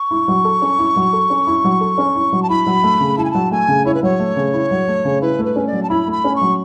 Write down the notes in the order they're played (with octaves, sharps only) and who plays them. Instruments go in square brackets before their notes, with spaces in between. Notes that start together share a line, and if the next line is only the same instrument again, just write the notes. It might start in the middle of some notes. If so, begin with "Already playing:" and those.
Already playing: [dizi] C#6
[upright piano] E4
F#3
A4
C#4
E4
F#3
A4
C#4
E4
F#3
A4
C#4
E4
F#3
[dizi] A5
[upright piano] E4 [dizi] B5
[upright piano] F#3
A3
C#3
[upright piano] E4 [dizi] A5
[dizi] G#5
[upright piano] F#3 [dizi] A5
[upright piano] A3 [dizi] G#5
[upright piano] C#3
[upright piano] E4 [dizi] C#5
[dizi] B4
[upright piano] F#3 [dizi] C#5
[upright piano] A3
C#3
E4
F#3
A3
C#3
[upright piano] E4 [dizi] B4
[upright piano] A3
[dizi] B4
[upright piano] C#4
[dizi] D5
[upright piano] F#3
[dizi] A5
[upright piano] E4 [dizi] B5
[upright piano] A3
[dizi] B5
[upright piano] C#4
[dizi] C#6
[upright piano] F#3